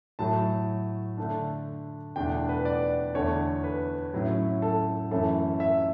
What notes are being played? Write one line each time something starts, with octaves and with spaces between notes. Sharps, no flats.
A2 F#3 A3 A5
D3 A3 D4
E2 B2 A3 D4 G5
F#5
B4
D5
E2 D3 A3 D4 C#5
B4
A2 F#3 C#4 E4
A4
F#2 E3 A3 A4
E5